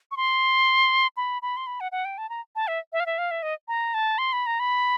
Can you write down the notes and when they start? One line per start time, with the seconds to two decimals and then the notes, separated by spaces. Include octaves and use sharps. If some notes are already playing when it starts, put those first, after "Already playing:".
0.11 C#6
0.17 C6
1.17 B5
1.42 B5
1.57 C6
1.67 B5
1.80 F#5
1.92 F#5
2.05 G5
2.18 A5
2.30 A#5
2.56 A5
2.68 E5
2.93 E5
3.00 F5
3.06 E5
3.18 F5
3.31 E5
3.43 D#5
3.68 A#5
3.94 A5
4.18 C6
4.33 B5
4.46 A#5
4.60 B5